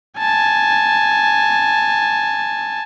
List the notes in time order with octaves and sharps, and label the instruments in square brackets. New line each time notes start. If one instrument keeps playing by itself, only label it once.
[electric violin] G#5 A5